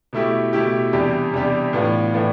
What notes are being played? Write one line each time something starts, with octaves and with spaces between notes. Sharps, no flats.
B2 A3 E4 G4
B2 A3 E4 G4
E2 C3 G3 D4 G4
E2 C3 G3 D4 G4
A2 E3 B3 D4 F4
A2 E3 B3 D4 F4